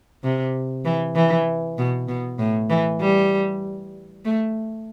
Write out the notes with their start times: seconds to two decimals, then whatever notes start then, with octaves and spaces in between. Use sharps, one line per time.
0.23 C3
0.85 E3
1.15 E3
1.78 B2
2.08 B2
2.39 A2
2.70 E3
3.00 G3
4.25 A3